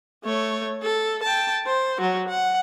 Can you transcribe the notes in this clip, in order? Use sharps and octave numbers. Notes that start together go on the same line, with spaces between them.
A3 C#5
A4
G5 A5
C5
F#3 F#4
F#5